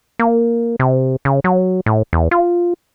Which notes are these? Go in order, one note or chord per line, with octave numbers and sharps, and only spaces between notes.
A#3
C3
C#3
F#3
A2
E2
F4